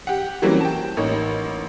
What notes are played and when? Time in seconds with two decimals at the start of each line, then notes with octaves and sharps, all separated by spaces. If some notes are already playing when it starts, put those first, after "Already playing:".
0.07 G4 F#5
0.42 E3 F#3 G3 A#3 C4 C#4
0.61 G5 A5
0.97 A1 A#3 D#4 C#5